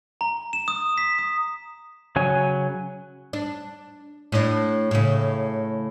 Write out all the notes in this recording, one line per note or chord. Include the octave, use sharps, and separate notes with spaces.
A#5
E7
D#6
B6
D#6
C#3 F#3 C#5 G#5
D4
A2 D4
A2 C#3